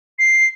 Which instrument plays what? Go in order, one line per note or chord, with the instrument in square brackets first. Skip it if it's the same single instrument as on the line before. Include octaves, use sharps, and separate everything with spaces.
[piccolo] C7